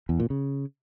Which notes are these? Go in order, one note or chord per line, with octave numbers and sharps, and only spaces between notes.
E2
A#2
C#3